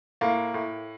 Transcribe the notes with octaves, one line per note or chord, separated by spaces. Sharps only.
A2 A#3
A2